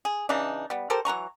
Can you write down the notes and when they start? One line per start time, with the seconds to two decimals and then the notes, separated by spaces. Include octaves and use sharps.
0.05 G#4
0.29 C#3 E3 D4 D#4
0.70 G3 B3
0.90 G4 A4 A#4 C5
1.05 E3 F#3 A#5 C#6